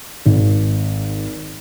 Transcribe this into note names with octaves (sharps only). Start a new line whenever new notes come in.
G#1